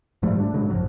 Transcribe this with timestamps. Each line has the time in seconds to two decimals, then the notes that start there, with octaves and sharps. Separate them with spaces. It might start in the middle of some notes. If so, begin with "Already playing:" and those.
0.22 G#2 F3 G3 A3
0.40 D4
0.53 G#2 C#3 F#3 G#3
0.70 A1 F#2 F3 F#3